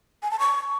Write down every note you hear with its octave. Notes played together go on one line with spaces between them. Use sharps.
G#5
A5
C#6